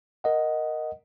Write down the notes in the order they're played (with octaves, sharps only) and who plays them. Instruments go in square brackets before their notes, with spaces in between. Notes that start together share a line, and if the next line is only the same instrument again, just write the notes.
[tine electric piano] A#4 D#5 F#5